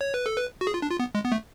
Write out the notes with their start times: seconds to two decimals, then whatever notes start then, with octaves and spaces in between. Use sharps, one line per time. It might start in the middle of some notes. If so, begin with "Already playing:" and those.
0.01 C#5
0.14 B4
0.26 A4
0.37 B4
0.61 F#4
0.67 G#4
0.74 F4
0.82 D4
0.91 F4
1.00 B3
1.15 G#3
1.25 B3
1.32 A3